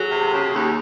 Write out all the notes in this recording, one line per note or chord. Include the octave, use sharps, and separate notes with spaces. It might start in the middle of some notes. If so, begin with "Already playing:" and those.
Already playing: F#3 G#4 A4
C3
C#3
D#2